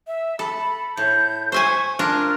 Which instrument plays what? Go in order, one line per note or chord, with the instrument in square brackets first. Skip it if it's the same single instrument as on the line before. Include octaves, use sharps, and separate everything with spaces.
[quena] E5
[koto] A4 [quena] B5
[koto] A2 [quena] G6
[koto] C5 E5 G#5 [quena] C#6
[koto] D4 F4 A#4 [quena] F6